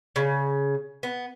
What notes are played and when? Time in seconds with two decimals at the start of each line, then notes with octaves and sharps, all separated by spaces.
0.16 C#3
1.03 B3